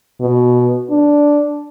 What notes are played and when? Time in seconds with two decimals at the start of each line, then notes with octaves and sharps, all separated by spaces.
0.20 B2
0.90 D4